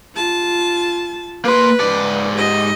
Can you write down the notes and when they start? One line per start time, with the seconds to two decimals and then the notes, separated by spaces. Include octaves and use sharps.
0.15 F4 A5
1.45 A#3 B4 C6
1.81 G#2 D5
2.35 G4 D#5